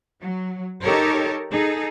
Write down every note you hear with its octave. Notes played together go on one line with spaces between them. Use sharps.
F#3
D#4 G4 A4 A#4 C#5
D#4 G#4 A4